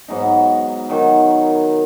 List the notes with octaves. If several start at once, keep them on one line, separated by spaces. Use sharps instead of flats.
G#2 F#3 B3 D#4
D#3 F#3